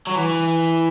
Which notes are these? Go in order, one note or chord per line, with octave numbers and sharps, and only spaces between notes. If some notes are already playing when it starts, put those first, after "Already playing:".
F#3
E3